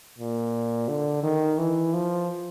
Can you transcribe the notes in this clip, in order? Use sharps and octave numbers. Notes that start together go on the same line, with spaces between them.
A#2
D3
D#3
E3
F3